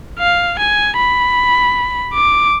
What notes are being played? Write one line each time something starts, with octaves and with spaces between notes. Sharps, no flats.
F5
G#5
B5
D6